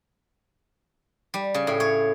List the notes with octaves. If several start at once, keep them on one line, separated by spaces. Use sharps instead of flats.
G3
C#3
A2
C#5